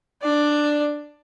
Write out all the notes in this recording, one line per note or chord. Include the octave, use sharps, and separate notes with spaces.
D4 D5